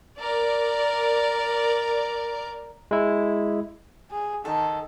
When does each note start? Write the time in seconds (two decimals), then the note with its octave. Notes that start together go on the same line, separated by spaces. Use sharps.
0.20 A#4 D5
2.91 G#3 E4
4.11 G#4
4.45 D#3 A4